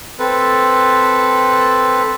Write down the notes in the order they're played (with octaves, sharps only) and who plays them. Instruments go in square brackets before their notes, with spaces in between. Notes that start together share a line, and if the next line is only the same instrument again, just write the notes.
[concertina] C4 A4 B4